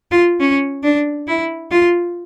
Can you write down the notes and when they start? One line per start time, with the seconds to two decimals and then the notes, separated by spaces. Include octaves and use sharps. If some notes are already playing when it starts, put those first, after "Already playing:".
0.11 F4
0.40 C#4
0.84 D4
1.27 E4
1.71 F4